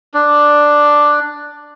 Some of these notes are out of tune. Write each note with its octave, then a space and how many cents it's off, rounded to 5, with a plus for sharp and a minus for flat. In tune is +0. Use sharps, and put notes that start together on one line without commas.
D4 +5 D5 +0